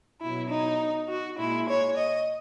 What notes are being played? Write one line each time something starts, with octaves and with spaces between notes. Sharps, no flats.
B2 F#3 E4
D#4
F#4
A#2 G#3 E4
C#5
D#5